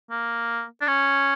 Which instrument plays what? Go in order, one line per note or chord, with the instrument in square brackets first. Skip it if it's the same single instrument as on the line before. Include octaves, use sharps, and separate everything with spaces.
[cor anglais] A#3
D4
C#4